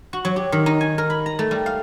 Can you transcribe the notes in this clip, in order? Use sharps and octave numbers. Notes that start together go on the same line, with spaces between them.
F#4
F#3
G4
D#3
D#4
G#5
A#4
B5
A#5
A3
G3
F5